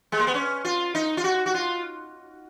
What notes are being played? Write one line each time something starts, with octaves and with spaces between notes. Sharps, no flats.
G#3
A#3
B3
C#4
F4
D#4
F4
F#4
F#4
F4